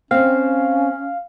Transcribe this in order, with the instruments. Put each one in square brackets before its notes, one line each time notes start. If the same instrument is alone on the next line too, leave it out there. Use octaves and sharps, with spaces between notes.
[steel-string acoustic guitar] C4 [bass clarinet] C#4 [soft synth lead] F5